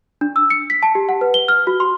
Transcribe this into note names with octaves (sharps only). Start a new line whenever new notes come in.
D4
E6
C#7
B6
A5
G4
F#5
B4
G7
F6
F#4
C6